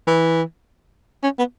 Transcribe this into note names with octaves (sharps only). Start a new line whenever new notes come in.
E3
C#4
B3